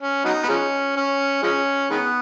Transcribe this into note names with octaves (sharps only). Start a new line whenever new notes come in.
C#4
F#3 B3 D#4
B3
F3 G#3 C#4
C#4
F3 G#3 C#4
D#3 G#3 B3